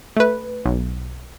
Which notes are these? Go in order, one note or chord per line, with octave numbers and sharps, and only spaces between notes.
A3 B4
B1